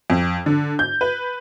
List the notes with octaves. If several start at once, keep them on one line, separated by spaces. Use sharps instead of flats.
F2
D3
G6
B4